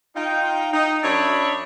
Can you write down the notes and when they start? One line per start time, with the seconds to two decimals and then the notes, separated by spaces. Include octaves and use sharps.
0.16 D#4 F4 G5
0.73 D#4
1.04 F#2 D4 D#4 C#5 E5 B5